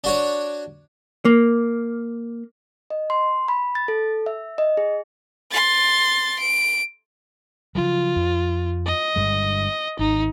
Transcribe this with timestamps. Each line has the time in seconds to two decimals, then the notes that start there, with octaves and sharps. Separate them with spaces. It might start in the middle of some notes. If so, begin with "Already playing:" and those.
0.04 D4 F#4 C#5
1.25 A#3
2.90 D#5
3.10 C6
3.48 B5
3.75 A6
3.88 A4
4.26 E5
4.58 D#5
4.77 G#4
5.51 C6 A6
6.39 D7
7.75 C#3 F3 F#3 F4
8.16 F2
8.86 D#5
9.16 G1 G2 G#3
9.99 G#1 D#4